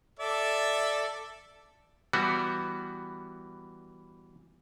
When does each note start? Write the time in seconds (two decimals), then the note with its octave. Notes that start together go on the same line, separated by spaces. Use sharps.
0.19 A4 D5 E5
2.13 E3 G3 B3 F#4